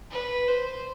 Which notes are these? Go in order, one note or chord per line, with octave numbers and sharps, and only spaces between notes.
B4
C5